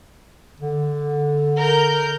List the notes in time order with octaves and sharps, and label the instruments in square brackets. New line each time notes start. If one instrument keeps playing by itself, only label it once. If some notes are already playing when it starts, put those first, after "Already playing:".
[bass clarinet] D3
[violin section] A#4 G6